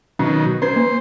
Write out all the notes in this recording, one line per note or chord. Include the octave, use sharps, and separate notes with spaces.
B2 D#3 F#3 C#4
C#4 B4 C5
A#3